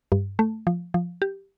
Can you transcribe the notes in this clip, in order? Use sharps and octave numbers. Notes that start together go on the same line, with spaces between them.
G2
A3
F3
F3
G4